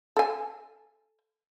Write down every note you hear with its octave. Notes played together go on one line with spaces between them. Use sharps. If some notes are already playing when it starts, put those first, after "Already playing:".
A4 G#5